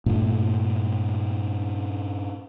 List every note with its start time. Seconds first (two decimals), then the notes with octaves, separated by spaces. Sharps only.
0.06 G2 A#2 A3